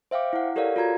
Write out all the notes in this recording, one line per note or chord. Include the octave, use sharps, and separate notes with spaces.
C5 E5 F5 G5 D6
E4 F#5
G4 A4 A#4 C#5 D5 F5
F4 F#4 A#5 G#6